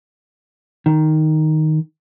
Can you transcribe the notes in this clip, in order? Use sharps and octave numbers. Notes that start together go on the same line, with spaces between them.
D#3